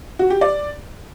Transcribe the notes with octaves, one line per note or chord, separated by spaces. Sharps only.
F#4
G4
D5